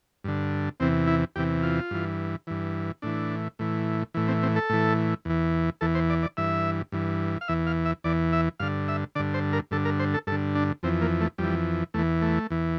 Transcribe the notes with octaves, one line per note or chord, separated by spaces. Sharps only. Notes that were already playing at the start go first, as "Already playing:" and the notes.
G2 D3
E2 C3 E3 C4
E4
E2 C3 E3 G4
F4
G2 E3
G2 E3
A2 E3 D4
A2 E3
A2 E3
C4
C4
A4
A2 E3
E2 E3
E2 E3 A4
C5
D5
D5
G2 E3 E5
G2 E3
F5
E2 E3 E5
F5
E5
E2 E3 D5
E5
G2 D3 F5
E5
G2 D3 D5
C5
A#4
G2 D3 A4
A#4
C5
A4
G2 D3 A4
D4
F2 E3 C4
A#3
A3
F2 E3 G3
E2 E3 A3
A3
E2 E3